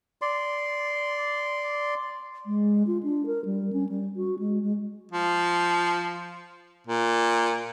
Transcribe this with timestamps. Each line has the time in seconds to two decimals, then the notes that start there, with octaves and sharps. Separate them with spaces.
0.22 D5 C6
2.46 G#3
2.87 F4
3.03 D4
3.26 A#4
3.45 G3
3.73 C#4
3.89 G3
4.16 F#4
4.39 G#3
4.63 G#3
5.12 F3
6.87 A#2